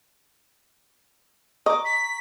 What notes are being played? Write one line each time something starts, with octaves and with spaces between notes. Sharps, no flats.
D#5 A#5 C#6 D6
B6